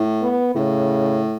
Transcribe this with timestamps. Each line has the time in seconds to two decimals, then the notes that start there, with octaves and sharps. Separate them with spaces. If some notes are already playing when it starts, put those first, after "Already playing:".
Already playing: A2
0.22 B3
0.55 A2 C#3